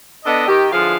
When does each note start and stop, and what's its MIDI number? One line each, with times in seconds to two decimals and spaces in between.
0.25 0.44 59
0.25 0.44 62
0.25 0.44 69
0.25 0.44 75
0.47 0.70 51
0.47 0.70 67
0.72 0.97 50
0.72 0.97 52
0.72 0.97 53
0.72 0.97 65
0.72 0.97 68
0.72 0.97 77